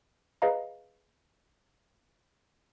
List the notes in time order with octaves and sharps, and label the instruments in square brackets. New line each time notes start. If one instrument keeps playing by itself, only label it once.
[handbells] G#4 B4 D#5 F5 A#5